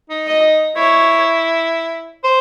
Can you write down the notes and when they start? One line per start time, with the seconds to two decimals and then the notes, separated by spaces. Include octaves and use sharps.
0.10 D#4
0.27 D#5
0.76 E4 C#5
2.24 C5